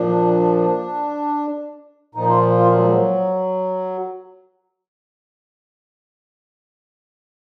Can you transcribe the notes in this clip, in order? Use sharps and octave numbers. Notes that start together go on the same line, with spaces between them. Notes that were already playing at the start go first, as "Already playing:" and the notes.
Already playing: A#2 F3 D4
A#2 F3 D#4
F4
F4
F#3
G#3
F#3